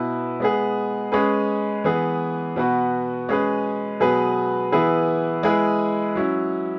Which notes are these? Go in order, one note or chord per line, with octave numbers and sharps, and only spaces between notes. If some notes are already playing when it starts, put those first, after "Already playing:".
Already playing: B2 B3 E4 B4
G#3 B3 G#4
G#3 C#4 G#4 B4
E3 B3 G#4
B2 B3 F#4 B4
G#3 C#4 G#4 B4
B2 F#3 B3 G#4 B4
E3 B3 E4 G#4 B4
G#3 E4 G#4 B4
F#3 C#4 E4